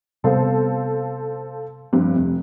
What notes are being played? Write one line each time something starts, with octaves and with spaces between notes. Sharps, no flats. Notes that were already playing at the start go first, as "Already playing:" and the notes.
C3 G3 B3 A4 C5 F5
G2 F3 G3 C4
F1